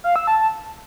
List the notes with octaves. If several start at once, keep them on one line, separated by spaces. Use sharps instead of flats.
F5
E6
A5